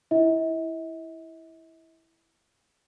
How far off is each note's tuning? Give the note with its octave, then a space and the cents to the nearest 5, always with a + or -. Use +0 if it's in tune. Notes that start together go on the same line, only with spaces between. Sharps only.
E4 +0 E5 -45